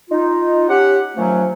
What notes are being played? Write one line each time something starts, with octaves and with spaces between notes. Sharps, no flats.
D#4 F4
C#4 G4 F#5
D#3 F3 F#3 A3 C#4